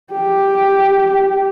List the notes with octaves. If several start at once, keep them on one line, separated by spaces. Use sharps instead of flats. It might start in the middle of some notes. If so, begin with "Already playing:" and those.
G4